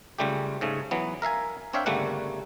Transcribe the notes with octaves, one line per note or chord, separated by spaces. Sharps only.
C#2 C#3 G3 A3 G4
G#2 C#3 A3
E3 F#3 B3
A#4 E5 F5 G#5
C4 D4 C#5 E5 F5 G5
G1 C#3 G3 A3 A#3 F#5